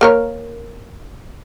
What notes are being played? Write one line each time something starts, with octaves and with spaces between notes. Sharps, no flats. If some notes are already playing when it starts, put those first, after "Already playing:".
A#3 A#4 C#5